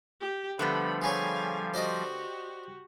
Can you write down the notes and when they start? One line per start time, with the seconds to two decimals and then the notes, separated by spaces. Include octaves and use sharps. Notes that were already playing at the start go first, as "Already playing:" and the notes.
0.21 G4
0.59 D3 F3 G3 A3 B3 B5
1.02 G#4 B4 C#5 F5 G#5
1.74 F#4 G4 C5 D5 D#5